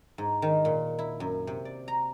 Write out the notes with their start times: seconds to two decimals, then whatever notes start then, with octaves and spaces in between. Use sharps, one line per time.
0.18 G#2
0.42 D#3
0.65 A#2
0.99 E4
1.20 F#2
1.47 C3
1.65 D5
1.88 A#5